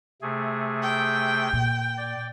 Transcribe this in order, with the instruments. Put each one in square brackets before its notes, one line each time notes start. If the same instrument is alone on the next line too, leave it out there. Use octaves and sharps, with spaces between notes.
[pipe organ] C3 A3 G#4
[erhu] G5
[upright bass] A#2
[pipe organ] D5